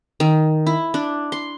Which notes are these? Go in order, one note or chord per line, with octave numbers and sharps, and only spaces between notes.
D#3
E4
D4
C6